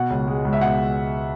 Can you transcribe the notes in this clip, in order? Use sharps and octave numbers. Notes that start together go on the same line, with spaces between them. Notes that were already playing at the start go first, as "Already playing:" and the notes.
Already playing: B2 F#5
C#2
G#3
C#2
E5
B2 F#5